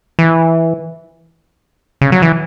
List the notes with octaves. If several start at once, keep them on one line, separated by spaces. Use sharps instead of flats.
E3
C#3
F#3
E3